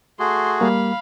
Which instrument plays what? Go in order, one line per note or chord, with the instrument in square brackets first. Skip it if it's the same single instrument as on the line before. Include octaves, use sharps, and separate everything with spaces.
[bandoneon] A3 F#4 G#4 [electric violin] C6
[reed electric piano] G3 A#3 [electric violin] F5 B5